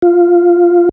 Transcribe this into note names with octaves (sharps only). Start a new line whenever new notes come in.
F4